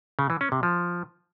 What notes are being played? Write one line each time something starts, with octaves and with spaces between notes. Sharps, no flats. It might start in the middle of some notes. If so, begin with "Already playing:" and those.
C#3
E3
C#4
C3
F3